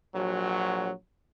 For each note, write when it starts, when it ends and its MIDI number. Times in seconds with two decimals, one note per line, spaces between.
0.13 0.90 34
0.13 0.90 54